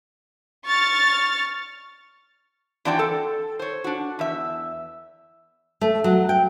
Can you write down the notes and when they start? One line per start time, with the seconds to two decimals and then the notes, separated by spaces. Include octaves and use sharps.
0.67 C#6 F6 A6
2.85 E3 C4 D4 F#4 D5 G5
2.99 A4
3.59 C5 C#5
3.84 D4 F#4
4.19 E2 E5
5.81 A3
6.04 F#3
6.29 G5